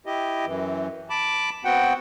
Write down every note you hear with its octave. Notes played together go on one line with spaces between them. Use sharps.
E4 G4 D#5
F#2 E3
A5 B5 D6
B3 C4 F#4 F#5 G5